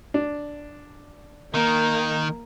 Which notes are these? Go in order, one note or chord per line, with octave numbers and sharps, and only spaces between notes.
D4
D#3 A#3